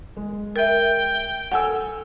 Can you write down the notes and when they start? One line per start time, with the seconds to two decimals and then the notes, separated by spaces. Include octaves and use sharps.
0.17 G#3
0.56 A#4 E5 G5
1.52 A4 F#5 G#5 E6